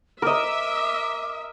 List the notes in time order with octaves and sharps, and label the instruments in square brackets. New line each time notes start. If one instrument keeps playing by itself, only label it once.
[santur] A#4 D#5 [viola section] E5 [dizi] D6